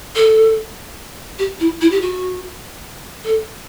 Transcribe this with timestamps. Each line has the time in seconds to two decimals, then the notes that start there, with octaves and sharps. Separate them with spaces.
0.15 A4
1.39 G4
1.60 E4
1.81 E4
1.91 G4
2.01 F#4
3.24 A4